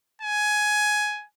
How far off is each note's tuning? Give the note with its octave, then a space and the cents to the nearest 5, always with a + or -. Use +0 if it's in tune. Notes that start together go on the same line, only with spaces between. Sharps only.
G#5 +15